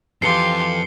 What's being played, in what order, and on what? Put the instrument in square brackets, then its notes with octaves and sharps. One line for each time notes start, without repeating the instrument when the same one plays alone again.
[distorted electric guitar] F2 [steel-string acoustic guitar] E3 A4 [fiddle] F4 G4 [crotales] C7 C#7 G7